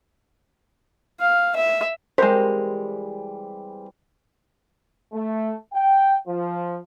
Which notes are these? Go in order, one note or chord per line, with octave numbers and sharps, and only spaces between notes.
F5
E5
E3 G3 G#3 C4 A#4 C5
A3
G5
F3